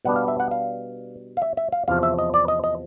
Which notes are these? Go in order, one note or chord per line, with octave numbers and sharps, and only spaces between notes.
B2 G3 B3 D4 F#5
F5
E5
F#5
F5
F5
E5
E5
F5
E2 C3 F3 F5
E5
D#5
D5
D#5
D#5